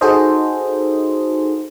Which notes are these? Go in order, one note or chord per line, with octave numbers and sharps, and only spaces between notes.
D#4 F#4 G#4 A4 C5 D#5